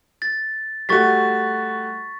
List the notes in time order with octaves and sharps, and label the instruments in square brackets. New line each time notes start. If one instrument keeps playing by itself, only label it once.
[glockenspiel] A6
[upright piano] G3 A3 F#4 [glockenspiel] C#6 A6 B6